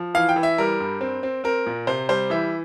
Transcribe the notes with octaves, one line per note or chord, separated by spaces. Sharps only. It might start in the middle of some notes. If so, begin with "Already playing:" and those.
Already playing: F3
E3 F5
G5
E3
E5
G3 A#4
G2
C4
C4
C4 A#4
A#2
C3 C5
G3 C5
E3 E5